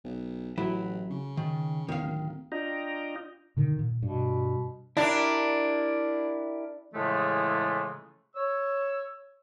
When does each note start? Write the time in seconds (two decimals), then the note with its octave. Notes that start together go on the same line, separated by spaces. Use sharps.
0.04 B1
0.58 A1 F#3 E4
1.10 C#3
1.37 D#3
1.88 E2 D#3 F5
2.02 D1
2.52 D4 F4 D#5 G5 A#5
3.57 B2 D3 D#3
3.79 A#2
4.03 G2 B2
4.97 D4 E4 G4 A#4
6.94 A2 C#3 E3 F3 G#3 A3
8.36 C#5 E6